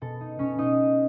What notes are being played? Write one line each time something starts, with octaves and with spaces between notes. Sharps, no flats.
B2 A4
D#4
B2 C#4 C#5
B2 D#4 D#5